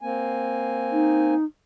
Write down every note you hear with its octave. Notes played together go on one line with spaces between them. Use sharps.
A#3 C4 G#5
D#4